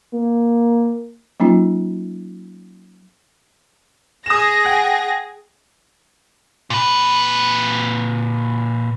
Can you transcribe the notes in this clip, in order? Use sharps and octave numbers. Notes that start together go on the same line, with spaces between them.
A#3
F#3 A#3 C#4 D#4 F4
G#4 D#6 A#6 E7
F#5 G5
A#2 B4